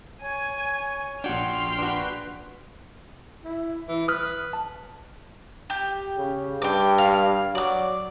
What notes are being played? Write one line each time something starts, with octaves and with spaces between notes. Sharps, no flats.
C#5 G#5
A#1 D4 F#4 G5 C6 F6
D4 F#4 B4
E4
E3
B4 D#6 F6
A5
G4
C#3
G2 G5 D6
F5
F#3 D5 D6